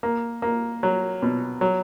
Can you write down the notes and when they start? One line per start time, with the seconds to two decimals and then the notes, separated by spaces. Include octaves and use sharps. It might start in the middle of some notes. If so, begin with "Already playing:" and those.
0.03 A#3
0.42 A#3
0.83 F#3
1.22 B2
1.61 F#3